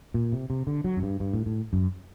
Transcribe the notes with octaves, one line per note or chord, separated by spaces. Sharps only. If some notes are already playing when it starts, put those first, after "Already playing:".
A#2
C3
C3
D3
F#3
F#2
G2
G2
A2
A2
F#2